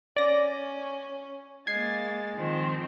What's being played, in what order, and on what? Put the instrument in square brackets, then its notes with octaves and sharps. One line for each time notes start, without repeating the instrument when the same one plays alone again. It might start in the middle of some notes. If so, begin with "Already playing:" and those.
[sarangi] C#4 [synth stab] D5 A#6
[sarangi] G#3 [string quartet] A#3 A6 [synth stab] G#6 C7
[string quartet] D#3 F3 C4